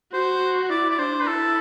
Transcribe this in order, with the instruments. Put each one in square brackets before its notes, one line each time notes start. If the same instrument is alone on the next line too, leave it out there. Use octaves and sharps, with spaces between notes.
[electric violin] F#4 [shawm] C5
[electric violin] E4 [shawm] D5
[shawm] D5
[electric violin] D4 [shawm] C5
[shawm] B4
[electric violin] E4 [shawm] A4